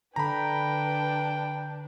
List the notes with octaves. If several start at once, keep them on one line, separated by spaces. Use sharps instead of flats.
D3 D4 B4 G5 A#5 B5